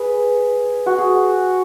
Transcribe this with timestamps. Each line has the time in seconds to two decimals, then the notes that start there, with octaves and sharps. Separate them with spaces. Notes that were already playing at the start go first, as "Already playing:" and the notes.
Already playing: G#4 B4
0.86 F#4
0.98 G#4